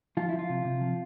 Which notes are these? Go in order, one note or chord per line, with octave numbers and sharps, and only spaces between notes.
F3 F4
E4
F3
F4
C3
C3
F3